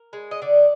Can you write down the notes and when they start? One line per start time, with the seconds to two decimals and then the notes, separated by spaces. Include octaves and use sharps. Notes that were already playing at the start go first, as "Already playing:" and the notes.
Already playing: A#4
0.13 G#3
0.31 D#5
0.42 D3 D5